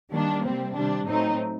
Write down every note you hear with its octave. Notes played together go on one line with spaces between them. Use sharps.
D#3 G3 A#3 D4
C3 G3 C4
C3 D#3 G3 D4
A2 F#3 A3 C4 D#4